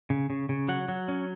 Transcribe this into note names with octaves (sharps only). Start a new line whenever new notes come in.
C#3
C#3
C#3
F#3 F#5
F#3
C#4